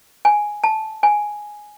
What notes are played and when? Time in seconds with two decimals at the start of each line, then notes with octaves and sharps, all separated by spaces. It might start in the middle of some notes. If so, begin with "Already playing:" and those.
0.25 G#5
0.64 A5
1.03 G#5